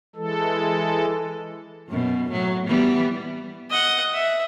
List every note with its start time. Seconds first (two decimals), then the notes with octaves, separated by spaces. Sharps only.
0.16 E3 G#3 A4
1.89 F#2 B2
2.30 A2 F#3
2.67 E3 G3 B3
3.70 D#5 F#5
4.14 E5